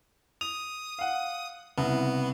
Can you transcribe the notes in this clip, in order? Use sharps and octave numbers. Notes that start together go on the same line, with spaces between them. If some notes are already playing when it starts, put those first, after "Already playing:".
D#6 F7
F5 F#5
C2 C#3 B3